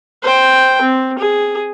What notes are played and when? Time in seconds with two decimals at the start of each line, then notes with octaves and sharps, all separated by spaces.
0.23 C5 G5
0.81 C4
1.19 G#4